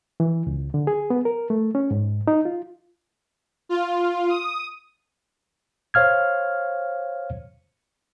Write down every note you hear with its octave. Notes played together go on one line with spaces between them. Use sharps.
E3
C#2
D3
G#4
B3
A#4
A3
C#4
G#2
D#4
F4
F4
D#6
C5 C#5 F5 F6 G#6